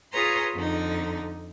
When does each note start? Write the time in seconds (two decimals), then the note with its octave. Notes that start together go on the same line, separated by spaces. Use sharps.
0.12 F4 G#4 B4 C#5 A#5 C6
0.54 F2 D3 D#4